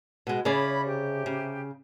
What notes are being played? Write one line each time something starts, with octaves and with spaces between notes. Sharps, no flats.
B2 G#3
C#3 E4 G#4 C#5 D5 B5
C3 G4
C#3